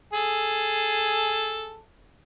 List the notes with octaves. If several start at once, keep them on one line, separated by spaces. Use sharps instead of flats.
G#4 A4